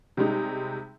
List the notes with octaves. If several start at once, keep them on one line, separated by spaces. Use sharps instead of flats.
C3 G3 G#3 D#4